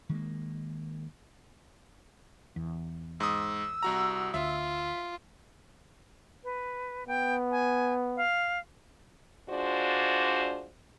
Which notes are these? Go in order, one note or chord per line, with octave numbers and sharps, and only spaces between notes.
D#3 G#3 A#3
E2
G#2 D#6 E6
C2 F#4 A#5
D2 F4 E5
B4
B3 G5
G#5
F5
G#3 D4 F4 F#4 C5 D5